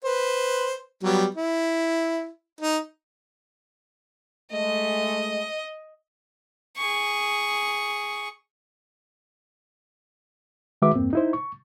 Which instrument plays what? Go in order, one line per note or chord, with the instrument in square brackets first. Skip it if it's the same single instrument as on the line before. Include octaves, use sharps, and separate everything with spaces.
[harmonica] B4 C5
F#3 G3 B3
E4
D#4
[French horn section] G#3 A3 [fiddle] D#5
[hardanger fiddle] G#4 C#6
[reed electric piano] D#3 G#3 F#4 B4 E5 D6
E2 G2 A#3 C4
D#4 E4 C5
C#6